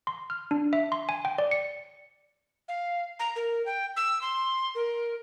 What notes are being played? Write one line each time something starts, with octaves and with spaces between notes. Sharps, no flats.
C6
F6
D4
E5
C6
G#5
G5
D5
C#7
F5
A#5
A#4
G5
E6
C6
A#4